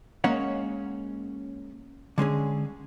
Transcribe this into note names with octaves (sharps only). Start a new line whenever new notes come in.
G#3 A#3 C#4 C#5 F#5
D3 G#3 C#4 G#4